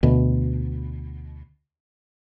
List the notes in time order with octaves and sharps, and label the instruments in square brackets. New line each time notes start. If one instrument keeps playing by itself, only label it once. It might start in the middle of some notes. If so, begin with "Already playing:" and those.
[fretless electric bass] D2 B2